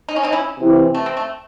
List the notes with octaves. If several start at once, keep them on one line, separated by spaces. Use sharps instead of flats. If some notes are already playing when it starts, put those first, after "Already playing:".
D#4
C#4
C4 D#4
C#4 E4
C3 E3 C4 E4
A3
C4
A3